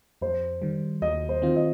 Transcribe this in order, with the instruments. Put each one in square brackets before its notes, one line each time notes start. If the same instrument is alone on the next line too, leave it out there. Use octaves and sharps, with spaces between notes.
[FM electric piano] F2 [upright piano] C5
[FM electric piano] D#3 G3
[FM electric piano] D#2 [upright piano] D#5
[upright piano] C5
[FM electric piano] D#3 C4 F4
[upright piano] D#5